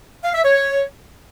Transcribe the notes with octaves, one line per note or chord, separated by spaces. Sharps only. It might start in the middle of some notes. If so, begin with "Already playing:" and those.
F5
E5
C#5